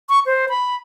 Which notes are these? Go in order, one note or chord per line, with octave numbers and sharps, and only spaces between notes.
C#6
C5
B5